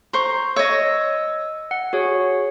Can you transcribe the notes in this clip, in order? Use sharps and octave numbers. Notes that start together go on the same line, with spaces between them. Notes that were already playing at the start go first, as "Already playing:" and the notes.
C5 A#5 C#6
C#5 D#5 E6 A#6
F#5
F#4 G#4 C#5